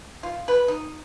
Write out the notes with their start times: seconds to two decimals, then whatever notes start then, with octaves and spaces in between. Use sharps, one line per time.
0.23 F4
0.48 B4
0.68 D#4